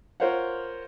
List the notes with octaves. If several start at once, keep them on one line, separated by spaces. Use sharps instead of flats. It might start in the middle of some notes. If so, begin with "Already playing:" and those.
F4 A#4 C5 C#5 F5 F#5